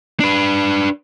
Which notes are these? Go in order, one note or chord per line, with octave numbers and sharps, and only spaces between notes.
D4 B4